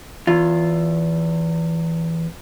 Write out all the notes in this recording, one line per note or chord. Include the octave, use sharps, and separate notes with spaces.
E2 F4